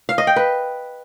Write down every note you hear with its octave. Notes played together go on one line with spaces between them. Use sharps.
F5
D#5
G5
B4